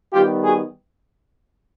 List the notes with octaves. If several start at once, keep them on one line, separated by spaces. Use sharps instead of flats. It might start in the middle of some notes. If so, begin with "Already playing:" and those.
D#3 G3 B3 F4 G4
F#4 G#4